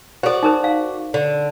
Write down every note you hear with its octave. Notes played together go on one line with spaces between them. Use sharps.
F#4 A4 C5 D5
D#4 A#4 C5
F5
D3